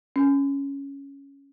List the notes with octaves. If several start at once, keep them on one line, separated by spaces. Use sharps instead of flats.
C#4